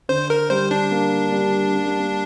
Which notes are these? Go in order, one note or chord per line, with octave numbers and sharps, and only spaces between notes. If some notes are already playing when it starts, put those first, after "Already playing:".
D3 C5
A#4
G3 C5
D4
A#3
G3
A#3
G3
A#3